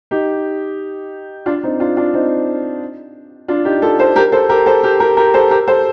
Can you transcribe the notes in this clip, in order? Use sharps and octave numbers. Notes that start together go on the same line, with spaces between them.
D#4 G4
D4 F4
C4 D#4
D4 F4
D4 F4
C4 D#4
D4 F4
D#4 G4
F4 A4
A4 C5
G4 A#4
A4 C5
G4 A#4
A4 C5
G4 A#4
G4 A#4
G4 A#4
A4 C5
G4 A#4
A4 C5